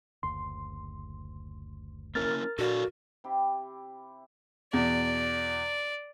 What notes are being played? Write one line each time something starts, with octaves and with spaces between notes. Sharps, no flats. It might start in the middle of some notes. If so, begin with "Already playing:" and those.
F#1 D2 C6
A#3 C#4 E4 A#4 F6 A6
A#2 D4 F#4 A4 D5 F5
C3 E4 G4
E2 B2 D5